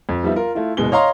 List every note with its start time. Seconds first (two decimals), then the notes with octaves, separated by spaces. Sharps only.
0.09 F2
0.23 F3 G3 B3 D#4 E5
0.36 F4 A#4
0.55 A3 E4 F4
0.77 F#1 B2 G#3 G7
0.92 C#5 D#5 F5 A#5 C6